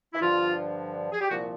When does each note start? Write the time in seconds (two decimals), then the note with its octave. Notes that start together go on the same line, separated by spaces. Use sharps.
0.14 E4
0.21 G2 D3 F3 F4
1.12 G#4
1.20 G4
1.29 C2 A#2 F3 F#4